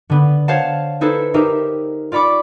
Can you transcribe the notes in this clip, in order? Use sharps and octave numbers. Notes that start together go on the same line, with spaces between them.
D3 B3
C5 C#5 F5 F#5 A5
D#4 E4 A4 B4 C5
D#4 G4 A#4 C5 E5
F4 D5 B5 C#6 D6